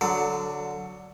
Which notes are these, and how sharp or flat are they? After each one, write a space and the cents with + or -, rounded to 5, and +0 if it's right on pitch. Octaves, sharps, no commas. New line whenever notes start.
D3 -5 F#3 +0 A4 +25